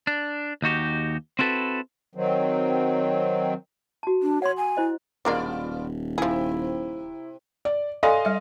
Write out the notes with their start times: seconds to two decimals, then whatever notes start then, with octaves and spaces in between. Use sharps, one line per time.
0.07 D4
0.62 D#2 D#4 F#4 G4
1.39 C4 E4 F#4 A4 B4
2.15 D#3 F#3 C4
4.03 F#4 A5
4.23 D4
4.42 C#5 F#5 C6
4.57 G#5
4.77 E4 C5 D#5
5.25 D#1 B2 G#3 A#3 D4 F4 D5
6.18 C3 F3 E4 G#4
7.65 D5
8.03 A4 D5 D#5 F5 G#5 C6
8.25 G3 E5